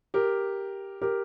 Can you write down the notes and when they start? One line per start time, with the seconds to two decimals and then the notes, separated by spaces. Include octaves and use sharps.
0.14 G4 A#4
1.02 G4 A#4